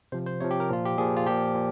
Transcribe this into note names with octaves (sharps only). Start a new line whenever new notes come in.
C3 F3 C5
C5
C3 F3 C#5
G4
A#4
A#2 F3 F4
G4
A#2 F3 G#4
F4
A#2 F3 G4
A#2